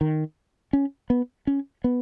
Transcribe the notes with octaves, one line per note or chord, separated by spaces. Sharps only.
D#3
C#4
B3
C#4
B3